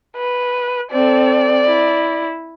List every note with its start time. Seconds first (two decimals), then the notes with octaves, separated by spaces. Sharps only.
0.17 B4
0.91 C4 A4 D5
1.66 E4